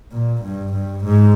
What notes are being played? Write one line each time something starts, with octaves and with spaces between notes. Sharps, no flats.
A#2
G2
G2
G#2